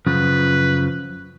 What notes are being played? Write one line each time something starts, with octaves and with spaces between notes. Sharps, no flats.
F#2 C#3 F3 B4